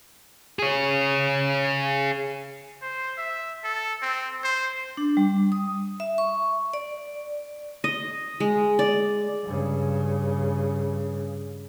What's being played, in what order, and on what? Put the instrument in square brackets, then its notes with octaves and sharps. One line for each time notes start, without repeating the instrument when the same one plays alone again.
[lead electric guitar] G#4 C#5
[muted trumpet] C5
E5
A4
C4
C5
[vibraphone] D4
G3
D#6
E5
C#6
D5
[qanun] D#5
G#3
D5
[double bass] G2 C#3